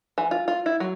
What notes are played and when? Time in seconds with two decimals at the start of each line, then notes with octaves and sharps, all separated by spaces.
0.18 E3
0.31 F4
0.48 F4
0.66 E4
0.80 F#3